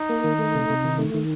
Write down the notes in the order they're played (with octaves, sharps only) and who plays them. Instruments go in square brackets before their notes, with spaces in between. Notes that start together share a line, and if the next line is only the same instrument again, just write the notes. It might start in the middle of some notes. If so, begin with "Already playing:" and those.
Already playing: [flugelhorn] D#4
[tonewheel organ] A#3
D#3
A3
C3
C3
D#3
A3
D#3